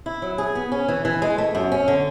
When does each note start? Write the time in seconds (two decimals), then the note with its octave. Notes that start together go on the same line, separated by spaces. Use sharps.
0.06 E4
0.22 F#3
0.38 G#4
0.55 B3
0.72 C#4
0.88 E3
1.05 E3
1.22 G#3
1.38 A3
1.55 F#2
1.72 C#4
1.88 D3